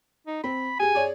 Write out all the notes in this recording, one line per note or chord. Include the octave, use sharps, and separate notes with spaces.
D#4
C4 B5
G4 G#4 G#5
G#4 C#5 D5